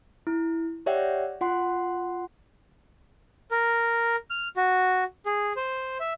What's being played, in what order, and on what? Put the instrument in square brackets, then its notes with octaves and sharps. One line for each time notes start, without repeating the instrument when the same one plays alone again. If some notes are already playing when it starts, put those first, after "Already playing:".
[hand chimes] E4
G4 C#5 D5 E5 F#5 G5
F4 F#5 C6
[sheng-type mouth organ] A#4
F6
F#4
G#4
C5
E5